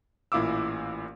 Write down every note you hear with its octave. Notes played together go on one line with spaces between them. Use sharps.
A1 A#2 E4 F5 D6 E6